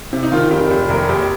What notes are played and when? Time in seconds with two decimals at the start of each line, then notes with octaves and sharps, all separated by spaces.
0.13 C3
0.23 D#4
0.32 D#3 F4
0.51 F1 G4
0.70 F1 G4
0.89 A#1 A#4
1.09 A#1 G4